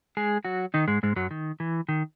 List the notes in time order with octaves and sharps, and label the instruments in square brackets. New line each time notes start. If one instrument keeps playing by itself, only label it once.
[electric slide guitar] G#3 G#4
F#3 F#4
D#3 D#4
G#2 G#3
G#2 G#3
F#2 F#3
D#3
E3
D#3